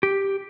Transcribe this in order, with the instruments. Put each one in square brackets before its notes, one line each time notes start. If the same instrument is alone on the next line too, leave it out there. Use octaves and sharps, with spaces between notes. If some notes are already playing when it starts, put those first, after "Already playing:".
[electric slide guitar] G4